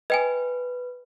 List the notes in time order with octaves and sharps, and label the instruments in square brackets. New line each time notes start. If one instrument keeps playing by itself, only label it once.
[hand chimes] B4 [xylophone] D#5 G5 G#5